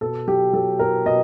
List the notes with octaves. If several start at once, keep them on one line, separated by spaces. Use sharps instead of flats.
B2 A4
F#3 G4
F#3 A4
B2 A#4
B2 D#5